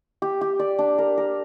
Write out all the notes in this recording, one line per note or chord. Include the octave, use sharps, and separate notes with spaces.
G4
G4
D5
D4
A#4
A#4